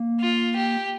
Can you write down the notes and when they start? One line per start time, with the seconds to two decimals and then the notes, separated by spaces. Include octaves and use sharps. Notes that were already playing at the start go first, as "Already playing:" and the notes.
Already playing: A#3
0.21 F4
0.56 G4